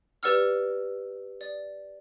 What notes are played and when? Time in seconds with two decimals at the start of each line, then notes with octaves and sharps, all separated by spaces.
0.23 G4 B4 D5 F#5 E6 F6
1.41 D5